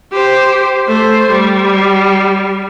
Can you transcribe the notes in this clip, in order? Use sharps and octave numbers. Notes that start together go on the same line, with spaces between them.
G4 C5
A3 C5
G3